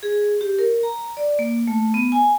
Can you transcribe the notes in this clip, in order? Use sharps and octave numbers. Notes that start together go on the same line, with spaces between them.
G#4
G4
A#4
A#5
D5
A#3
A3
B3
G#5